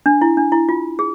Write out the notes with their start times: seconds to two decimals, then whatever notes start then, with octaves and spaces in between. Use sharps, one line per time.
0.06 D4
0.22 E4
0.37 D4
0.52 E4
0.69 F4
0.99 G#4